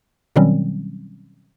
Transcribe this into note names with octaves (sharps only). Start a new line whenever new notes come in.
B2 D#3 F#3 G3 C4 C#4